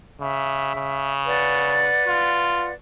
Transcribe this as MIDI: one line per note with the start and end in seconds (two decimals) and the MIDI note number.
0.20 0.71 49
0.20 1.10 76
0.76 1.97 49
1.26 2.73 71
1.26 2.73 74
1.26 2.73 78
2.07 2.69 65